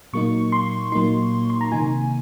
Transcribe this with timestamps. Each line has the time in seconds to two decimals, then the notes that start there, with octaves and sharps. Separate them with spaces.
0.13 A#2 F#3 A#3 D#4 C#6
0.52 C6
0.92 A#2 F#3 A#3 D#4 C6
1.50 C6
1.61 A#5
1.72 C3 D#3 A#3 D#4 G#5